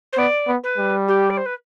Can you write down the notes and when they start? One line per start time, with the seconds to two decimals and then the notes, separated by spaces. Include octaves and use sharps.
0.12 C5
0.17 B3 D5
0.47 B3
0.63 B4
0.78 G3
1.08 G4
1.30 D5
1.37 C5
1.45 B4